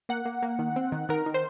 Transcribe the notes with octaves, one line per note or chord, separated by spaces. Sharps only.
A#3 F#5
A#3
A#3
D#3
C4
D#3
D#3 A#4
D#3
C5